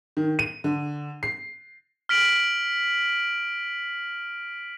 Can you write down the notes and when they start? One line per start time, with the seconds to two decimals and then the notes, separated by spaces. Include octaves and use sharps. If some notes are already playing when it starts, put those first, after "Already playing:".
0.17 D#3
0.39 D#7
0.64 D3
1.23 C7
2.09 F6 B6 D7 F#7